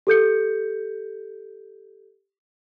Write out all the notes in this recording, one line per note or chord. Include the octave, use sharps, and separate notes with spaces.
G4 A4 G6 C#7